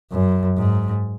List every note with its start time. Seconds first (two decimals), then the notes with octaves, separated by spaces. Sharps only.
0.12 F#2
0.58 G#2